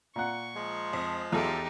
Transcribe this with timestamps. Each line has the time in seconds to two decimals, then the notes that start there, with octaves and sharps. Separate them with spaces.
0.16 A#2 F#5 C#6
0.54 F3 G#3
0.93 F2
1.32 E2 D#4 F4 G4 A4